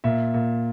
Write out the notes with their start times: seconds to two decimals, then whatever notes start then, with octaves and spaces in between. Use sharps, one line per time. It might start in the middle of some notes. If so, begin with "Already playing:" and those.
0.04 A#2 E5
0.34 A#2